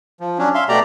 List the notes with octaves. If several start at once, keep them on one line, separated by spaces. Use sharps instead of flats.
F3
F#3 C#4 D4
E5 F5 C6
B2 A3 G4 D5 A#5